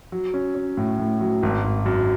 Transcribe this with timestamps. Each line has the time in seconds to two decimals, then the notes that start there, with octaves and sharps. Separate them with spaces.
0.12 F#3
0.34 C#4
0.55 C#4
0.77 A2
0.99 A2
1.21 F#3
1.43 G#1
1.64 G#1
1.86 F#2